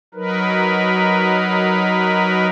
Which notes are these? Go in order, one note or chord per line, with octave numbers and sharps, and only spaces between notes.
F#3 D#4 A#4 B4